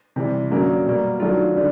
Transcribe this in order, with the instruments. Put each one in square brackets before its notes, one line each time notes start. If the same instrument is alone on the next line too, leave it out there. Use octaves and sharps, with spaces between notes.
[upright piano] C3 E3 G3
F#2 D3 F#3 A#3 D4
B2 G3 A#3
D#3 F#3 A3 D4 F4
D3 G3